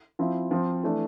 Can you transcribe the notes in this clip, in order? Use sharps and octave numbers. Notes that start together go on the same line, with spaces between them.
F3 C4 E4
F3 C4 F4
E3 A3 D4